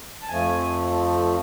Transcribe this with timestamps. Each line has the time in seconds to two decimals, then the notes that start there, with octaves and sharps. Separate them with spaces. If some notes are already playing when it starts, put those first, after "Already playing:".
0.22 A5
0.29 F2 F3 A3 G#5